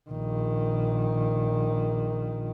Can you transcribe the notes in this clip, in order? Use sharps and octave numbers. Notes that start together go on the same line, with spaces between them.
A#1 D#3